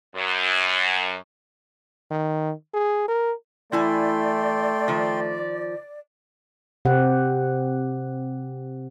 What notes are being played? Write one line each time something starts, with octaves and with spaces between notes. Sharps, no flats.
F#2
D#3
G#4
A#4
E3 A3 E4 D5 G5 G#5 C6
D#3 F3
C3 C4 G4 F#5